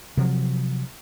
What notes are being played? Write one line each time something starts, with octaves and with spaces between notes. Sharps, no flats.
C3 F3 F#3